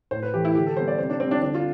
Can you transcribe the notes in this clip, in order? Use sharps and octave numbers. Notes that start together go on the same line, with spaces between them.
A2 C5
B4
E3 A3 G4
E4
D3 G4
A4
G3 B3 C5
D5
C3 C5
D4
G3 C4
D4
D3 D4
F4